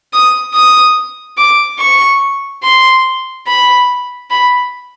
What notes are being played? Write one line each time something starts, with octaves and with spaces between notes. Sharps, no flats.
D#6
D#6
D6
C#6
C6
B5
B5